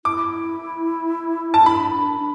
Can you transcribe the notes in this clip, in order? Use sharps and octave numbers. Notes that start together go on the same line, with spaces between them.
E4 D6
A5
D4 B5
D4
D4